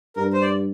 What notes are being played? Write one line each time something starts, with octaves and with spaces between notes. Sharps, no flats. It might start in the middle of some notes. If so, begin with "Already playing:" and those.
G2 A#4
C5
D5